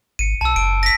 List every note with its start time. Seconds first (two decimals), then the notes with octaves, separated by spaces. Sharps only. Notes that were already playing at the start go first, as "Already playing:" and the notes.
0.19 G#1 C#7 D#7
0.41 B1 A5 E6
0.56 F#1 D7
0.83 A#6 B6